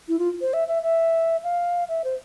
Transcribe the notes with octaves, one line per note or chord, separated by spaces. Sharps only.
E4
F4
C5
E5
E5
E5
F5
E5
C5